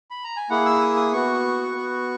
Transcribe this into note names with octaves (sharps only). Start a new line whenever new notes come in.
B5
A#5
G#5
A#3 E4 G#4 F#5
E6
D#6
D#6
B3 F#4 C#6
B3 F#4